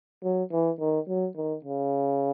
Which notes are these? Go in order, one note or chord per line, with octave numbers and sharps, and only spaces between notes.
F#3
E3
D#3
F#3
D#3
C#3